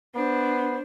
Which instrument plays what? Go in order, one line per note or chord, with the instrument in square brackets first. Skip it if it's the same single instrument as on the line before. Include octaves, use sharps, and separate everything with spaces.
[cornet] B3 [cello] D4 [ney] C5